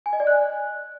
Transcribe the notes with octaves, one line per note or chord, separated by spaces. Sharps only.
G#5
D#5
D5
F#6